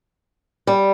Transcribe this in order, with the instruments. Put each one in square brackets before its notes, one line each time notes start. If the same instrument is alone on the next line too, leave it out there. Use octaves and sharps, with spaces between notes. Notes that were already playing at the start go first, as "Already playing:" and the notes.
[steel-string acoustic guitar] G3